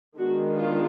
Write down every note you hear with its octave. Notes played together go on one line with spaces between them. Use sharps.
D#3 G#3 B3 D4 F#4
F4